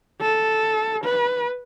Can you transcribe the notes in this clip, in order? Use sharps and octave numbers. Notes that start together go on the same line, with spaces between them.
A4
B4